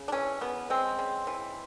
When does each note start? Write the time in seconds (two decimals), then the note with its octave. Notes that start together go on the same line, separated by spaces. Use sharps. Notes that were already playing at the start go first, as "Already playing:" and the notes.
Already playing: C#3
0.08 D4
0.12 E3 C#4
0.41 C#3 B3
0.70 G#3 C4
0.99 C#3
1.27 E3